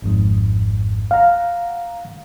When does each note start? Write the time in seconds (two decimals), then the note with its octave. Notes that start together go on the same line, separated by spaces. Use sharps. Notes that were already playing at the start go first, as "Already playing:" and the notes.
0.02 G#1 F2 G#2
1.11 F5 F#5 A#5